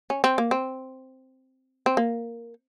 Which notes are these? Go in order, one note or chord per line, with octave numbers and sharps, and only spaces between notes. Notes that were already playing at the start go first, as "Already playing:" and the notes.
C#4
C4
A#3
C4
C4
A#3